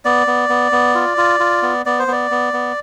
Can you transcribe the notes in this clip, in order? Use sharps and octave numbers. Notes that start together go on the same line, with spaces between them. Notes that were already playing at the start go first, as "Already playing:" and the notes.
B3 D5
B3
B3
B3
F4
F4
F4
B3
B3 D5
C5
B3 D5
B3
B3